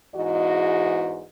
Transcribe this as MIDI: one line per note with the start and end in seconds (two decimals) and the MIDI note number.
0.15 1.25 40
0.15 1.25 44
0.15 1.25 52
0.15 1.25 66
0.15 1.25 75